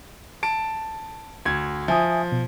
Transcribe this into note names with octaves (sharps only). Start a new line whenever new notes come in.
A5 D7
D2 G#6
F3 E5 G#5 D#6
B2